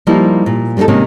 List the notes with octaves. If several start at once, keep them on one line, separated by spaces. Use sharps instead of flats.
F3 G3 A#3 D#4 E4
A#2
G3 A#3 C4 D#4 A4
C3 D#3 G#3 A#3 C#4